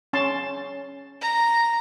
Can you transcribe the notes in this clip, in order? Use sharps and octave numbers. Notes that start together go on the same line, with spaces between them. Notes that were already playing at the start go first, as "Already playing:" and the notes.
C#4 A5 C6
A#5